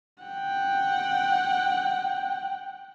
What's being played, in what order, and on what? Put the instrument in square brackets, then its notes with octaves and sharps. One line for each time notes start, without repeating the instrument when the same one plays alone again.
[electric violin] F#5 G5